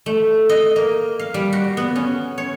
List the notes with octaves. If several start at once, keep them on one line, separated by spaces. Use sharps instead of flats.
A3
D#5
A#3
F5
G3
F#4
B3
C#4
C#5